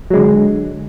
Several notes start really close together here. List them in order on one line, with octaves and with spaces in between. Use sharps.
F#3 G#3 D3